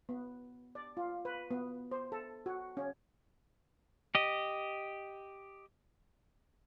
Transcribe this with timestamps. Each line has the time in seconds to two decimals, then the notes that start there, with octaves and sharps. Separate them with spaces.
0.09 B3
0.75 D5
0.97 F4
1.25 B4
1.51 B3
1.92 C5
2.12 A4
2.46 F#4
2.77 C#4
4.15 G4 D#5